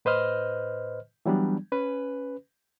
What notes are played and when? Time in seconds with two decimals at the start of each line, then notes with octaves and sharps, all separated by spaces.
0.05 A2 B4 C5 D#5 F6
1.26 E3 F#3 G3 B3 D4
1.72 C#4 B4